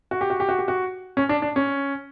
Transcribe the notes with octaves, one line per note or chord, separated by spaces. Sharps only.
F#4
G4
F#4
G4
F#4
G4
F#4
C#4
D4
D4
C#4